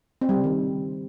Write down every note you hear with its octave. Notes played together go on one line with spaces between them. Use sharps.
C4
G3
C#3
D#3